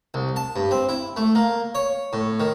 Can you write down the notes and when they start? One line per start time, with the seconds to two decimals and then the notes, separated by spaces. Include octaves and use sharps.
0.14 C2
0.36 A5
0.56 G2
0.71 C4
0.89 E4
1.16 A3
1.35 A#3
1.75 C#5
2.13 A2
2.40 D#3